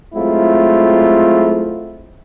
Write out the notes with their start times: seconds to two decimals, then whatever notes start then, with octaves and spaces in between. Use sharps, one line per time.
0.14 F#3 G#3 A3 C4 E4 F4